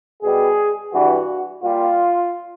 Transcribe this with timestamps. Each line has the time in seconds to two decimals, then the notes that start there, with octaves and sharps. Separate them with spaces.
0.23 B2 G3 G#4
0.93 G2 E3 G3 F#4
1.62 A#2 G3 F4